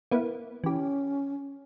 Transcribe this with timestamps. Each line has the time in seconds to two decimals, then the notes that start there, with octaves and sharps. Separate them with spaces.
0.11 A#3 B3 E4
0.64 E3 C#4 G4